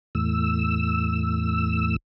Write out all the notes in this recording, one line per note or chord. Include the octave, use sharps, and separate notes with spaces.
E2 A2 E6